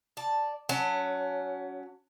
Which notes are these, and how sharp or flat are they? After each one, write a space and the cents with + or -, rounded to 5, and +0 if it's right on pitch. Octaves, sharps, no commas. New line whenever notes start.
D5 +0 A5 +0
F#3 +0 C#4 +25 A5 +30